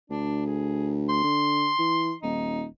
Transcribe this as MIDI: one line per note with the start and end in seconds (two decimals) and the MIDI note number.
0.10 1.23 38
0.10 0.42 62
0.46 0.94 68
1.10 2.16 84
1.24 1.69 50
1.79 2.13 52
2.23 2.66 27
2.23 2.63 63